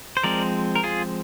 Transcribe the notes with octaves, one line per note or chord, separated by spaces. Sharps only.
C5
F3 G#3 C4 A#4 D5
A#4
F4 G#4